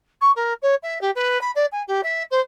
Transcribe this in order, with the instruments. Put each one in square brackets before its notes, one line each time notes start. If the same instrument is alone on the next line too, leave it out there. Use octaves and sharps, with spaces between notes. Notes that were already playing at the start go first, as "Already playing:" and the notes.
[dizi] C#6
A#4
C#5
E5
G4
B4
B5
D5
G#5
G4
E5
C5